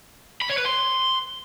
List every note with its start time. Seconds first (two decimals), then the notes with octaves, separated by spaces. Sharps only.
0.41 B5
0.49 C#5
0.58 B4
0.66 C6